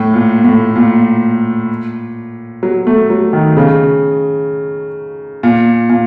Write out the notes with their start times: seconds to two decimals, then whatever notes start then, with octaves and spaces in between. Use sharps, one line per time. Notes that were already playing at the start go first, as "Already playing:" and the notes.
Already playing: A2
0.14 A#2
0.44 A2
0.76 A#2
2.63 F#3
2.87 A3
3.10 F#3
3.33 D#3
3.57 C#3
5.43 A#2
5.90 A#2